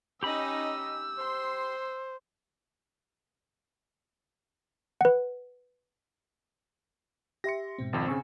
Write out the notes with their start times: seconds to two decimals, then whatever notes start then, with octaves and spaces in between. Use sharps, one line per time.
0.23 C#4 D#4 G4 D#5 B5 E6
1.19 C5 C6
5.01 B4 F#5
7.44 G4 E5 C6 A#6 C#7
7.78 G#2 B2 C4
7.93 G#1 F2
8.07 C#3 C4 G#5 C#6 E6